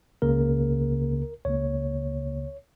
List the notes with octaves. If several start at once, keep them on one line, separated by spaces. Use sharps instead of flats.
C#2 C#3 A#3 A#4
C#2 C#3 A#3 C#5